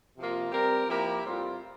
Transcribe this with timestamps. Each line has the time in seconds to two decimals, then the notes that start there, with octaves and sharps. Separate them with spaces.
0.17 C3 F3 A#3 F4
0.52 G3 C4 G4 A#4
0.87 F3 A#3 E4 G4 A#4
1.23 A2 G3 C4 F4